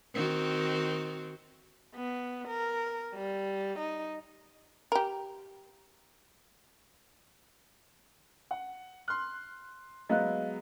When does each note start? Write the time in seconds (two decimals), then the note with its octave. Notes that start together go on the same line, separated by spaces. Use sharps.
0.14 D#3 C4 F#4
1.95 B3
2.48 A#4
3.15 G3
3.79 D#4
4.92 G4 A#4
8.51 F#5
9.08 C6 F6 F#6
10.09 F#3 G#3 B3 D#5 F5 F#6